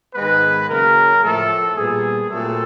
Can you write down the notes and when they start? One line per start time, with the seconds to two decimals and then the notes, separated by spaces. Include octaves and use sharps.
0.14 G#2 D#3 G#3 B3 B4
0.68 C#3 F#3 A#3 A#4
1.22 A2 F3 A3 A4
1.75 A#2 G3 B3 G#4
2.29 A#2 F#3 A3 C4 A4